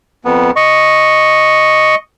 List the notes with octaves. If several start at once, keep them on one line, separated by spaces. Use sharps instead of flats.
F2 B3
D#5 C#6